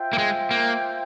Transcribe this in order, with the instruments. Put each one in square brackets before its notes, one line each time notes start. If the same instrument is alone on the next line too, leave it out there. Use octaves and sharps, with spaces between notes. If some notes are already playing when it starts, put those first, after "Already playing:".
Already playing: [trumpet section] F4 C5 E5 G5
[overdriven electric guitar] A#3
G#3
A#3